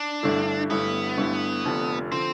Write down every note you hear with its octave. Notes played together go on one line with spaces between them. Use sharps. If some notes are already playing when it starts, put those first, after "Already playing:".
Already playing: D4
G1 G2 D3 A3 E4
G1 G2 D3 A3 B3 E4
G1 G2 D3 A3 E4
F1 F2 D3 F3
D3 F3 C4